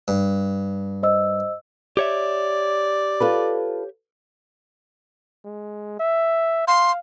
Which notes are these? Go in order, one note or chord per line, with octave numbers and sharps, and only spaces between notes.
G2
C5 D#5 E6
G4 C#5 D5 E5
F4 A4 B4
G#3
E5
F5 C6